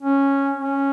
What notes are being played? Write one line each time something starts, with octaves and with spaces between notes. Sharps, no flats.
C#4
C#4